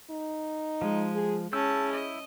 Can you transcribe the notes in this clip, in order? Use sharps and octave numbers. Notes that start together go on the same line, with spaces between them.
D#4
F3 G#3
G#4
C#4 E4 G#4 A5 E6 G6
D#5